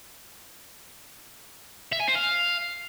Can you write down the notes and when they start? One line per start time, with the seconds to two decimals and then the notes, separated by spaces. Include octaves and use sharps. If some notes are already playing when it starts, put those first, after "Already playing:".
1.92 E5
2.00 G#5
2.07 C5
2.15 F5